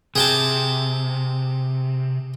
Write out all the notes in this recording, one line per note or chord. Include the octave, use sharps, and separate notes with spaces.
C3 G#4 G5 A5